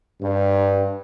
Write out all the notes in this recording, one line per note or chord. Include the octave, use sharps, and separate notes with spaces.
G2